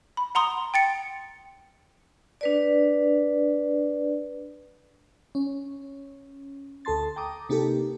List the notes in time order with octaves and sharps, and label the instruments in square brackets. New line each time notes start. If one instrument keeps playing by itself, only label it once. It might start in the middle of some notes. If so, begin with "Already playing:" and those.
[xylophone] B5
F#5 A#5 C6 D#6
G5 A6 C#7
[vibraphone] D4 B4 D5
[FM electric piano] C#4
D2 A4 A5 C6 A6
G5 A#5 D6 D#6
C3 A#3 D#4 G4 A4